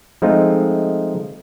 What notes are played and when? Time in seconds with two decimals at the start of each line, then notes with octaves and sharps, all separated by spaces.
0.22 F3 G#3 A3 C4 D#4 F4